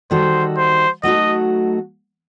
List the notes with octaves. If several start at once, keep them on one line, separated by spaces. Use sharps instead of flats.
D#3 G3 D#4 F#4 A4 C5
C5
F#3 A3 D#4 F#4 A4 D#5